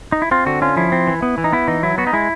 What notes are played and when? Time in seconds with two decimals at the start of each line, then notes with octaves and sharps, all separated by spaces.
0.12 D#4
0.22 E4
0.31 C4 F4
0.46 D3 F#4
0.62 C#4 F4
0.77 F3 E4
0.92 C4
1.07 E3
1.22 B3
1.38 E3
1.44 D#4
1.52 B3 E4
1.68 E3 D#4
1.83 F#3 E4
1.98 B3 F#4
2.07 D#4
2.13 G#3 E4